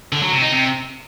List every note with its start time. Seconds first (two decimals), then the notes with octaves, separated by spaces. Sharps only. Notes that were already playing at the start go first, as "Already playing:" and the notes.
0.12 D3
0.22 F#3
0.32 C3
0.42 D#4
0.51 C3